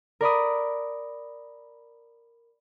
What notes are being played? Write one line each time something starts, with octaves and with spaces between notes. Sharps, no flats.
A#4 D5 B5 D#6